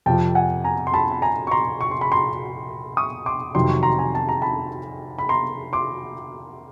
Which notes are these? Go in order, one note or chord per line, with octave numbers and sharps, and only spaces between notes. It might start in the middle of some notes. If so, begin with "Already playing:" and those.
F2 C3 F3 G5 A5
F#5 G#5
G#5 A#5
C6
A5 B5
B5
G#5 A#5
C#6
A#5 C6
C#6
C6
B5
A#5 C6
C#6 D#6
C6 D6
F2 C3 D#3 F#3 C6
C#6
A#5 C6
G#5 A#5
A5
A#5
A5 B5
B5
A#5 C6
C6 D6